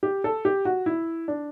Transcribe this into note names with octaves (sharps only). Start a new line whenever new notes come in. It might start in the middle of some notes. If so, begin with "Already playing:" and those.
G4
A4
G4
F#4
E4
D4